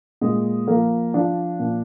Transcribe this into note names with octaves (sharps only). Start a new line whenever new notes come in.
A#2 G#3
F3 A#3
F3 D4
A#2